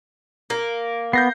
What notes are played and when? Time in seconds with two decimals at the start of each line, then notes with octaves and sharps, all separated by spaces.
0.50 A#3
1.13 B3 G6 A#6 C7